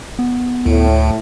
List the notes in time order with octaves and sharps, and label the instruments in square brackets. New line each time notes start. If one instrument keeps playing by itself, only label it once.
[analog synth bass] B3
[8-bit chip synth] D2 [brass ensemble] A2